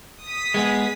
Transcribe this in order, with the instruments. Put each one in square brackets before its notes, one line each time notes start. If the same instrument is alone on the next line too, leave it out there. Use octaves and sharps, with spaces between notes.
[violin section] D#6 B6
[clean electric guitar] G#3 B3 G#4